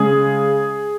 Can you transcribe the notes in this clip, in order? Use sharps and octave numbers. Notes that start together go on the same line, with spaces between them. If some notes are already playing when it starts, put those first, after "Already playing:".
Already playing: C#3 G#3 G#4